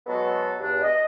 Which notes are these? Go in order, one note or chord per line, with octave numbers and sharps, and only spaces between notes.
B2 F#3 G#3 B3 F#4 A4
E2 G2 D4
D#5